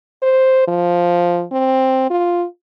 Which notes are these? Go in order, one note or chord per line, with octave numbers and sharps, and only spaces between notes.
C5
F3
C4
F4